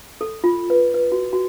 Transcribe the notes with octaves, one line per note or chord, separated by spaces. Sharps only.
A4
F4
B4
B4
F#4
F#4